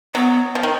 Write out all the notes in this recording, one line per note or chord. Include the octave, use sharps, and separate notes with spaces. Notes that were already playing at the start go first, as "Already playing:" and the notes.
F#3 B3
F3
D#3